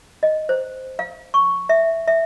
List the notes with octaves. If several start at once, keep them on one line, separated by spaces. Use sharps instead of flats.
D#5
C5
F5
C#6
E5
E5